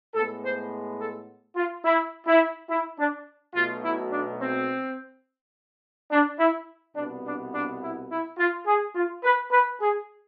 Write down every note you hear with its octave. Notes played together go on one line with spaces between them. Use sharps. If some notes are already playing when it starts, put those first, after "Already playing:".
A2 G#3 B3 A4
C5
A4
F4
E4
E4
E4
D4
B1 B2 A3 F4
E4
D4
C4
D4
E4
C2 B2 B3 D4
D4
D4
E4
E4
F4
G#4
F4
B4
B4
G#4